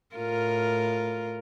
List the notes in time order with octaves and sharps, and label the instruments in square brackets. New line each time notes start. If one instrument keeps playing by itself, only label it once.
[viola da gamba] A2 F4 A#4